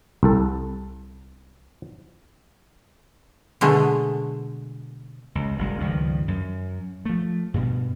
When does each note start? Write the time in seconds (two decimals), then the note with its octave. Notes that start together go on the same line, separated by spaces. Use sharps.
0.23 C2 A4
3.61 B2 D3 G#3 A3
5.35 C#2
5.59 F#1 C2 G#3
5.80 C#2 G2 D#3 F3
6.28 F#2
7.05 F3 A3
7.54 G2 B2